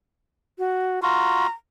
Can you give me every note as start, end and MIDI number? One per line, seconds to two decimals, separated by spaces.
0.59 1.02 66
1.03 1.47 65
1.03 1.47 66
1.03 1.51 82